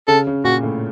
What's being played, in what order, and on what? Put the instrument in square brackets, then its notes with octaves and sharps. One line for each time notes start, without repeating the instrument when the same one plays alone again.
[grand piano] C#3 [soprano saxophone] A4
[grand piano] C#3
[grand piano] A#2 [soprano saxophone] F#4
[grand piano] A2